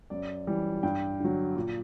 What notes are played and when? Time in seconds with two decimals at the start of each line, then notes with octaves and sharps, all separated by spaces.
0.10 F#2 D5
0.47 E3 G3
0.83 G2 G5
1.20 D3 F#3
1.56 A#2